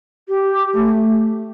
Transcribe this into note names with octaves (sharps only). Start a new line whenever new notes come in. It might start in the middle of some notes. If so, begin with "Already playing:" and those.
G4
A3